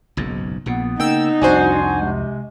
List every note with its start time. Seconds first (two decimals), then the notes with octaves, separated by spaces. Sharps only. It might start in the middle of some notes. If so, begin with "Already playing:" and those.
0.17 F#1 B1 G#2
0.66 A#1 A#2 B3
1.00 C#3 A#3 D#4 G5 E6
1.42 C2 F2 D4 F#4 C5 G#5
2.01 C3 G#3